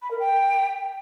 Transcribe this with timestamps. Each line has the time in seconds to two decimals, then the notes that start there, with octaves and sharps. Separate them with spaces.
0.02 B5
0.11 A#4
0.19 G5